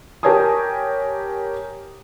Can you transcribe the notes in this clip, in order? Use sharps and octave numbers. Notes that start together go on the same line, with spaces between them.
G4 A#4 C#5 G#5 A5 D#6